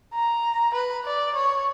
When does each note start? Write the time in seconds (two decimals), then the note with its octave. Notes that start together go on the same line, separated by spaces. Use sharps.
0.14 A#5
0.74 B4
1.05 D5
1.35 C#5